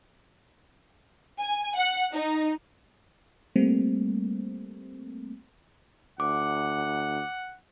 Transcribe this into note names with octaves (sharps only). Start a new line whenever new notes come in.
G#5
F#5
D#4
G3 A3 A#3 C4
D2 F#5 D6